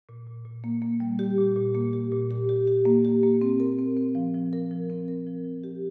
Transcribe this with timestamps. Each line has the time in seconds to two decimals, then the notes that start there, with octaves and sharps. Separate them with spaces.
0.09 A#2
0.26 A#2
0.45 A#2
0.64 A#3
0.82 A#3
1.00 G3
1.19 G4
1.38 A#2
1.56 A#2
1.75 A#3
1.93 G4
2.12 A#2
2.31 G4
2.49 G4
2.67 G4
2.85 A#3
3.05 G4
3.23 A#3
3.41 C4
3.60 A#4
3.79 C4
3.96 C4
4.15 F3
4.35 F3
4.53 A#4
4.71 F3
4.90 C4
5.08 A#4
5.27 F3
5.45 F3
5.64 G4